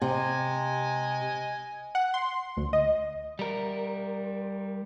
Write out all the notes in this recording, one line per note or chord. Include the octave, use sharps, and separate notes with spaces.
C3 D#5 G#5
F#5
C6
D2
D#5
G3 A#4